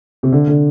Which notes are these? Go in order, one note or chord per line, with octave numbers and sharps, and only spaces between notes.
C3
D3
D3